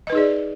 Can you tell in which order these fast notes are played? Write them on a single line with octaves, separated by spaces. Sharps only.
D#5 B4 D#4 G#4 D5